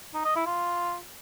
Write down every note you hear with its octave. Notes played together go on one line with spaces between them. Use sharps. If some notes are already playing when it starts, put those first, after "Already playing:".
D#4
D#5
E4
F4